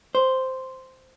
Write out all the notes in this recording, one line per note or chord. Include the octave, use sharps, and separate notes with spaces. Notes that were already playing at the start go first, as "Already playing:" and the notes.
C5